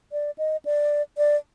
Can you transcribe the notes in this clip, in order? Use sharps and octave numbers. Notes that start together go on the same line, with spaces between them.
D5
D#5
D5
D5